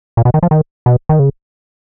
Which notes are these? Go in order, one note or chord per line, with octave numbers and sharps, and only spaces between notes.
A#2
B2
D#3
F3
D#3
B2
D#3
C#3